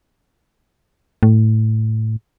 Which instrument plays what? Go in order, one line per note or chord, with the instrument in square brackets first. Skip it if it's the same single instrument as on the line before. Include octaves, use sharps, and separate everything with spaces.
[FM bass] A2